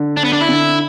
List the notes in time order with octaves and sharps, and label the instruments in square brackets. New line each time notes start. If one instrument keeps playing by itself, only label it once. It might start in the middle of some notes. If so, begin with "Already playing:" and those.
Already playing: [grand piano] D3
[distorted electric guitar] D4
B3
D4
E4
[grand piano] D3